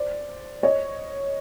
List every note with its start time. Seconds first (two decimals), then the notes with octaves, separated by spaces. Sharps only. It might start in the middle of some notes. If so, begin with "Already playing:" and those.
Already playing: C5 D5
0.63 C#5 D#5